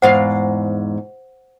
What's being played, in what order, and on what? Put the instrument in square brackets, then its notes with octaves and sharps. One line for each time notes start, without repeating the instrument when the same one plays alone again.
[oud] E2 G#2 F5 [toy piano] C5 F#5